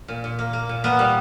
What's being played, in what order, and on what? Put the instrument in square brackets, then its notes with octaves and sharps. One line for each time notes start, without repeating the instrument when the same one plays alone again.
[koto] A#2
A#2
A#3
A#3
A#2
A#3 B3
G3